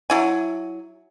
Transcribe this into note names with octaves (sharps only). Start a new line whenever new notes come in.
F#3 E4 G#5